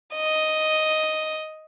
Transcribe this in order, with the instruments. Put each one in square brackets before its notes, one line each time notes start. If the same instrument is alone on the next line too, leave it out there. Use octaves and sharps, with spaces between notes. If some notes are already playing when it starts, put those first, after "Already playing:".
[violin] D#5